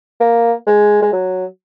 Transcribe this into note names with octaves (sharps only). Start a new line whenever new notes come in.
A#3
G#3
G#3
F#3